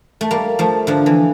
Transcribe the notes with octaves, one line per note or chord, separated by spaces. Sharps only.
A3
G3 A#3
F3 A3
D3 F3
E3